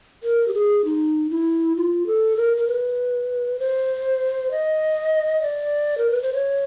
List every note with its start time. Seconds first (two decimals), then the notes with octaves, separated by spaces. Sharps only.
0.23 A#4
0.48 G4
0.54 G#4
0.85 D#4
1.30 E4
1.76 F4
2.07 A4
2.37 A#4
2.57 A#4
2.67 B4
3.60 C5
4.51 D#5
5.42 D5
5.98 A#4
6.10 B4
6.23 C5
6.34 C#5